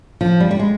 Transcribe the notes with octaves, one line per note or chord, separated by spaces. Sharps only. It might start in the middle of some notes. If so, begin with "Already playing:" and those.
F3
G3
G3
G#3